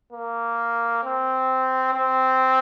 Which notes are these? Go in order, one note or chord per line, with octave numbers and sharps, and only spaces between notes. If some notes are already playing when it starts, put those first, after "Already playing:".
A#3
C4
C4